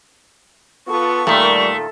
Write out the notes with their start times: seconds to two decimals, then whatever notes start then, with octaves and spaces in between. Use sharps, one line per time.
0.88 B3 F4 A4 C#6
1.27 A#2 D#3 G3 A3 A#4